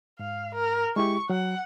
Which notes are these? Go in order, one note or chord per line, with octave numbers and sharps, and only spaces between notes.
G#2 F5
A#4
G#3 E4 G4 C#6
F#3 F#5